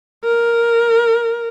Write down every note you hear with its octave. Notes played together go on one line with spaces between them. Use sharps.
A#4